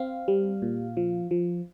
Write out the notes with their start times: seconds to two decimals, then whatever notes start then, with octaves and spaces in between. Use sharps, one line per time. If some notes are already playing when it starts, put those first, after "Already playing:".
Already playing: C4 F5
0.28 G3
0.62 A#2
0.97 F3
1.31 F3